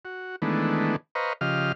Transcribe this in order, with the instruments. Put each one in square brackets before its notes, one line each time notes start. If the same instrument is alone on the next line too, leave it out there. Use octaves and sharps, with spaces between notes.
[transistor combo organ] F#4
D#3 E3 G#3 A3 B3 D4
B4 C5 D#5 F5 A#5 C#6
C#3 F3 G4 D#5 F5 F6